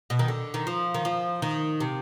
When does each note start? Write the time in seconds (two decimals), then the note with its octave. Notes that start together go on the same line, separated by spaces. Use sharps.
0.10 B2
0.19 D#3
0.28 D3
0.54 D#3
0.67 F3
0.94 D#3
1.05 F3
1.42 D#3
1.80 C3